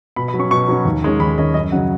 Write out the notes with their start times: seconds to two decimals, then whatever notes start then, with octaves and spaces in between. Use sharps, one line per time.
0.16 B2 B5
0.28 B5
0.34 F#3
0.39 C#4 C#6
0.51 B2 C#6
0.69 F#3 C#4
0.85 D#2
1.02 D#3 G#3 C#4
1.20 D#2 B5
1.38 D#3 G#3 C#4 D#5
1.54 F#2 D#5
1.72 C#3 F#3 C#4 F#5